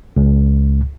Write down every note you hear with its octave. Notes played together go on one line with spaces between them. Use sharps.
C#2